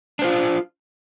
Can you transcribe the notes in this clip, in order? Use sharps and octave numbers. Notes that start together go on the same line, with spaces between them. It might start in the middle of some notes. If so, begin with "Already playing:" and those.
D4 F4 C5